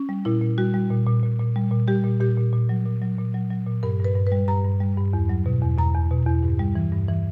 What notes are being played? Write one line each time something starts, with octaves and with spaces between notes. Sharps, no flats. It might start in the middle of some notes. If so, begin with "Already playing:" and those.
Already playing: C#4
G3
A#2 E4
A#2
G3 F#4
G3
A#2
A#2
A#2
A#2
G3
A#2
G3 G4
A#2
A#2 G4
A#2
A#2
F#3
A#2
F#3
A#2
F#3
F#3
A#2
G2 A#4
G2
B4
G2
B4
G3
G2 A#5
G2
G3
G2
E2
F#3
B2
E2
E2 A#5
E2
B2
E2
G2
G3
E3
G2
E3